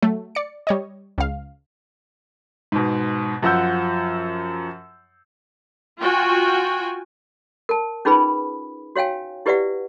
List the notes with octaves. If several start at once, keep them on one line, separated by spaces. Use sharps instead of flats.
F#3 A3
D5 C#7
G3 C#5 D#5
C#2 F5
G#2 B2
F#2 F3 F#5 E6 G6
F4 F#4 G5 G#5
A#4 A5
C#4 D#4 F4 G#4 B4 B5
F#4 C#5 F5 G5 G#5
E4 G4 B4 D5 E5 F#5